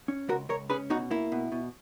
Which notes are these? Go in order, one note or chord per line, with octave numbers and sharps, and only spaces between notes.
C#4
C#2 F#4 A#4
C#2 A#4 C#5
C#4 G#4 B4
B2 D#4 F#4
A#3 E4
B2
B2